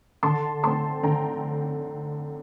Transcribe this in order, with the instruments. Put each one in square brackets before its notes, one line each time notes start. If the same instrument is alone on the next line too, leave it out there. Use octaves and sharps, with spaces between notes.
[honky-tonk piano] D3 A5 C6
A3 C4 A5 C6
D3 G5 A#5